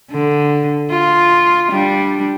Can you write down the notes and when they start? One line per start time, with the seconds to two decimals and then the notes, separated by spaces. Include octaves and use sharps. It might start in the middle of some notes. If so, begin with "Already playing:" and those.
0.11 D3
0.90 F4
1.71 G3 D4